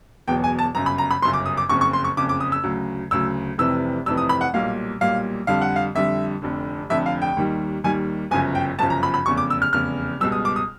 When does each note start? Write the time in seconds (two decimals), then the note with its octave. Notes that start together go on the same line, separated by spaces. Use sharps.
0.27 E1 E2 B2 F#3 G5
0.44 G#5
0.59 A5
0.75 G1 F#2 C#3 A#5
0.86 B5
0.98 A#5
1.11 B5
1.22 G1 F#2 C#3 C6
1.33 D6
1.46 D#6
1.57 D6
1.69 F#1 F2 C#3 C#6
1.81 C#6
1.93 C6
2.04 C#6
2.17 F#1 F2 C#3 D6
2.29 D6
2.40 D#6
2.52 E6
2.64 D2 C#3 F#3
3.11 D2 C#3 F#3 E6
3.58 F1 F2 C3 E3 E6
4.06 F1 F2 C3 E3 E6
4.17 D#6
4.29 B5
4.41 F#5
4.54 B1 A#2 G3 F5
5.01 B1 A#2 G3 F5
5.47 F2 D3 G3 F5
5.62 F#5
5.76 F5
5.95 F2 D3 G3 E5
6.42 F1 F2 D3
6.90 F1 F2 D3 E5
7.06 F5
7.22 G5
7.37 D#2 D#3 G3
7.84 D#2 D#3 G3 G#5
8.31 G1 F#2 C#3 F3 G#5
8.55 G5
8.79 G1 F#2 C#3 F3 A5
8.90 A#5
9.03 B5
9.14 B5
9.26 F1 E2 C#3 C#6
9.37 D6
9.50 E6
9.62 F6
9.73 F1 E2 C#3 F6
10.20 C#2 B2 G3 E6
10.32 D#6
10.45 D6
10.56 D#6